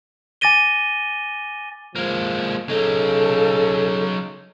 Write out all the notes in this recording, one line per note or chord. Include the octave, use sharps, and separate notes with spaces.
G#5 D6 A6 A#6 D#7 G7
F3 G#3 A#3
C#3 F#3 D#4 A4